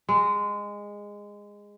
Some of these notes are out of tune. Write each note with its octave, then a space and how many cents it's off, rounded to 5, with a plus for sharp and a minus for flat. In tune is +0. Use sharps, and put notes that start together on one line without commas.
G#3 -15